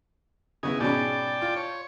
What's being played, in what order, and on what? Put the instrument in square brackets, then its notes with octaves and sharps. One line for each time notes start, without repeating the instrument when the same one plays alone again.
[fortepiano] C#3 B3 E4 [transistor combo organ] D#5 G#5
[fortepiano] G#2 B2 C#4 [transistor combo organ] D5 G5 A5
[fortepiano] F4
[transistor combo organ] C#5